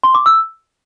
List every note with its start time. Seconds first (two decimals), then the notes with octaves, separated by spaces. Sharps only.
0.04 C6
0.15 D6
0.26 E6